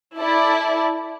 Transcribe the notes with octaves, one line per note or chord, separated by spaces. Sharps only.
E4 A4 D5 A5